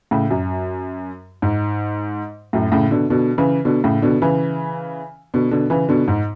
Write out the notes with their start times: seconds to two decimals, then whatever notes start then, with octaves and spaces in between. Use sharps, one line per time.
0.11 A2 C#3
0.30 F#2
1.42 G#2
2.53 F#2 A2
2.72 A2 C#3
2.91 B2 D3
3.10 B2 D3
3.38 C#3 E3
3.65 B2 D3
3.84 A2 C#3
4.02 B2 D3
4.22 C#3 E3
5.34 B2 D3
5.51 B2 D3
5.70 C#3 E3
5.89 B2 D3
6.08 G#2